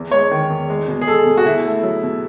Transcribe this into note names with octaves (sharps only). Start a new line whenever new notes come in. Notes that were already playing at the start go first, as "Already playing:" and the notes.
Already playing: E2
G#3 C#5
D#3
E2
G#3
B2
G#4
G#3 A4
B2
F#4
B2 E4
A3
F#3
B2